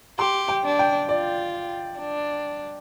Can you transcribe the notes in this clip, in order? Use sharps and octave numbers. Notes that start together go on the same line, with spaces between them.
G4 C6
G5
D4
G5
F4 D5
D4